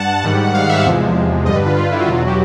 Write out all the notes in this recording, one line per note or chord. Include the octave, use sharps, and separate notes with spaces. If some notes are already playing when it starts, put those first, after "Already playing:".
Already playing: G2 F#5 A5
G#2 D#3 G3
F5
E5
E2 C3 F3 G#3
G2 D3 G3 D#5
B4
F4
F4
E4
F#4
E2 B2 F#3 F4
F#4
G4